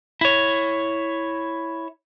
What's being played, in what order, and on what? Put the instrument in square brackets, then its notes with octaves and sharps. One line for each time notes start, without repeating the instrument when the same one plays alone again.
[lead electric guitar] E4 C#5